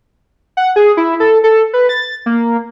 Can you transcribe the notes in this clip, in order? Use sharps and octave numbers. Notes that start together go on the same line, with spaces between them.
F#5
G#4
E4
A4
A4
B4
A6
A#3